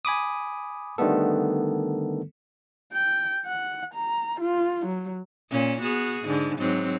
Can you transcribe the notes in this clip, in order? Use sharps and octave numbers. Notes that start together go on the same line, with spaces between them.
G#5 B5 D6 D#6
D3 D#3 G3 A3 B3 A4
G5
F#5
A#5
F4
F#3
A#2 C#4
B3 F#4 G#4
G#2 D3
G#2 F#3 C4